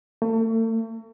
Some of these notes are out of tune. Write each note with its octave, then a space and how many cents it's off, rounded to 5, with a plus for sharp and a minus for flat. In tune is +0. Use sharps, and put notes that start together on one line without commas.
A3 +40